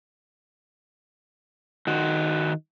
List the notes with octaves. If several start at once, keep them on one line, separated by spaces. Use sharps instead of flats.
D#3 F#4